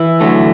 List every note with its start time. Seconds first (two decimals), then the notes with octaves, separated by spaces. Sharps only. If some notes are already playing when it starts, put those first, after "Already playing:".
Already playing: E3 E4
0.21 D3 F#3 A3